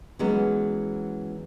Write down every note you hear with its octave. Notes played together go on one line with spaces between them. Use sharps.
E3 F#3 G#3 B3 C#4